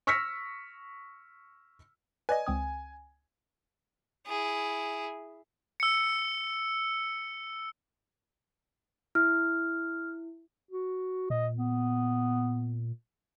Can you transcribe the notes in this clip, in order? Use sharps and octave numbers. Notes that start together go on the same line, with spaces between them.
C#6 E6 F6 A#6 B6 C#7
B4 D5 D#5 G#5
C#2 C4 D#6
E4 G#4
E6 C#7
E4 F6
F#4
A#2 D#5
B3